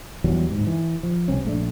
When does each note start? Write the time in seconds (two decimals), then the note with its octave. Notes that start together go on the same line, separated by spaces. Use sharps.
0.24 E2 E3 F#3 G3
0.50 D1 G#2
0.67 E3
1.03 F3
1.28 C2 C4 C#4
1.45 A#1 A3 D4